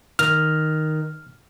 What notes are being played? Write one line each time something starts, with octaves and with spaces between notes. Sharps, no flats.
D#3 F6